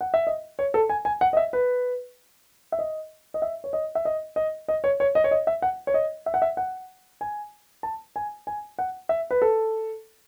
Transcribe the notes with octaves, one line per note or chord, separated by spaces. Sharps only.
F#5
E5
D#5
C#5
A4
G#5
G#5
F#5
D#5
E5
B4
E5
D#5
D#5
E5
C#5
D#5
E5
D#5
D#5
D#5
C#5
C#5
D#5
C#5
D#5
E5
F#5
C#5
D#5
E5
F#5
E5
F#5
G#5
A5
G#5
G#5
F#5
E5
B4
A4